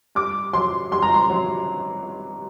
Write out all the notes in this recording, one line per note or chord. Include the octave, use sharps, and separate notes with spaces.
G2 D6
F#3 C6
G2 C6
A#5
C6
F#3